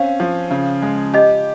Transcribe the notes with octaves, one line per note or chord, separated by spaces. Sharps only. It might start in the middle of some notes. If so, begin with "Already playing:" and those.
Already playing: C4 C#4 F5
F3
C#3
G#3
G4 D#5